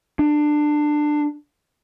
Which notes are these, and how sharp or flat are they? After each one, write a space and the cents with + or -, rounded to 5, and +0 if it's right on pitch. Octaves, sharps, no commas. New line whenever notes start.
D4 +20